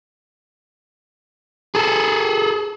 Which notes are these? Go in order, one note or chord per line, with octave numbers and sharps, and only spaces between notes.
G#4 A4